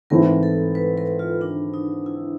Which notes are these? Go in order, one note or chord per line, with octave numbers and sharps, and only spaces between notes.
G#2 E3 A3 C4 E4 A#4
A4
B4
A#4
F4
D4
D#4
E4